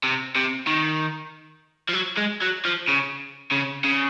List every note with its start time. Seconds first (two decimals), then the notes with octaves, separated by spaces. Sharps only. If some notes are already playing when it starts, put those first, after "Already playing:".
0.04 C3
0.36 C3
0.67 D#3
1.89 F3
1.94 F#3
2.17 G#3
2.42 F#3
2.65 F3
2.89 C#3
3.52 C#3
3.84 C#3